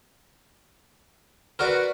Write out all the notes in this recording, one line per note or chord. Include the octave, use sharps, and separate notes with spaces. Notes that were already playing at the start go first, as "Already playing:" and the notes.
F#4 A#4 B4 D5